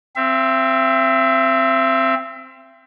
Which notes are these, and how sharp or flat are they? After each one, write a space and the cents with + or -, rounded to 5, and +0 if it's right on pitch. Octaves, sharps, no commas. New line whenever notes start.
C4 +0 E5 +35